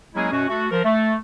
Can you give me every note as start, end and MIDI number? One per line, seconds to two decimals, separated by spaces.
0.15 0.29 54
0.15 0.29 56
0.15 0.29 58
0.15 0.29 61
0.15 0.29 64
0.15 0.29 68
0.32 0.48 42
0.32 0.48 47
0.32 0.48 61
0.32 0.48 66
0.49 0.66 57
0.49 0.66 66
0.71 0.81 53
0.71 0.81 70
0.84 1.16 57